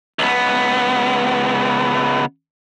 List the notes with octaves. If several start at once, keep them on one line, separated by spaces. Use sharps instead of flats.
C#2 B3